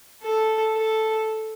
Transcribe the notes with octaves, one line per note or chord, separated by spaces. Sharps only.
A4
A4